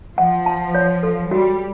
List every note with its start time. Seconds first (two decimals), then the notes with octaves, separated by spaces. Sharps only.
0.18 F3 F#5
0.46 A5
0.75 C#5
1.03 A4
1.31 G3 F#4